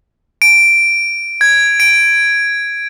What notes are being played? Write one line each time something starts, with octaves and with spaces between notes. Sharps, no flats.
D7
G#6
D7